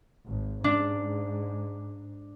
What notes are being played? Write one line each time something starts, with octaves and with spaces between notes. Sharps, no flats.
G#1
G#2 D4